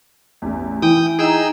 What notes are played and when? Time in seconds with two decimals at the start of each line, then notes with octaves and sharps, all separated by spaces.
0.42 A1 E2
0.82 E3 E4 G5 D#6
1.19 D#4 G#4 G5 E6